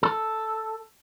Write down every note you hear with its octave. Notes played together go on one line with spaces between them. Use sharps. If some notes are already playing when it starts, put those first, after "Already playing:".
A4